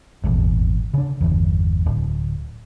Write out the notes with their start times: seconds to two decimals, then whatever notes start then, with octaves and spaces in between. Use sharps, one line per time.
0.24 D#1 G#1 E2
0.94 C#3 D4
1.21 G1 E2
1.86 D1